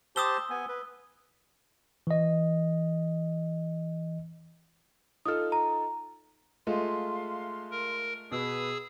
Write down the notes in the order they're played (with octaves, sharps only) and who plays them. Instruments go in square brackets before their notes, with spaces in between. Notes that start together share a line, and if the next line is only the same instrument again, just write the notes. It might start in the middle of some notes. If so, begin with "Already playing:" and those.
[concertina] G4 C5 A5 [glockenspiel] D#6 E6 G7
[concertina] B3 G#5
B4
[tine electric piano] E3 D#5
[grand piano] D#4 F4 A4 [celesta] D#6 F6
[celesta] A#5
[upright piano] G#3 A3 F4 [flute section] F5 C6
[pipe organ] A#4
[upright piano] B2 [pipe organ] G#4 D#6 E6 [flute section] B4